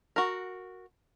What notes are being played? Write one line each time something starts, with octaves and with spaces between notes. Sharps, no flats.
F#4 A#4